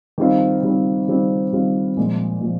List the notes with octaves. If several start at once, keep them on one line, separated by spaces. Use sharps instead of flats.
D#3 G3 C4 F4
D#3 G3 C4 F4
D#3 G3 C4 F4
D#3 G3 C4 F4
A#2 F3 G#3
A#2 F3